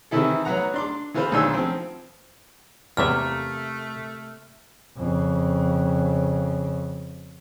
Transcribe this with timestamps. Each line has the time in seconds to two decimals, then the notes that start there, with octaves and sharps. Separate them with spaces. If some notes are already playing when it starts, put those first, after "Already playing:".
0.11 C3 D#3 E3 E4 A4
0.45 F#3 B3 F#5 A#5
0.74 D4 C6 D6
1.14 E3 B3 F4 B4 C5
1.32 B1 D#3 D4 G#5 C6 E6
1.53 F3 C4
2.97 E2 C3 A3 A#3 E5 F6
4.97 F2 C#3